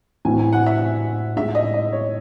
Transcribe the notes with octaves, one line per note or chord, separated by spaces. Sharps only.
A2 E3 C4 F#4 G#5
G#5
F#5
E5
A2 G#3 D#4 G#4 E5
D#5
D#5
C#5